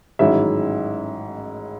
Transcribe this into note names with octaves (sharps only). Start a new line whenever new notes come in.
A1 G#2 D#3 F#3 C#4 E4 E5